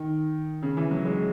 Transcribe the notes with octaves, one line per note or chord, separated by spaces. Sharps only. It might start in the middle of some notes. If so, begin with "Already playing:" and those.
Already playing: D#3
C#3
E3
F#3
G#3